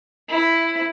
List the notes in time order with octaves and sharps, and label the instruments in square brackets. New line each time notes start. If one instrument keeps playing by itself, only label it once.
[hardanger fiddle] E4